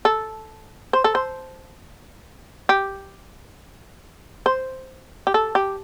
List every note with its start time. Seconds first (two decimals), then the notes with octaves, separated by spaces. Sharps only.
0.05 A4
0.93 C5
1.04 A4
1.15 C5
2.69 G4
4.46 C5
5.27 G4
5.34 A4
5.55 G4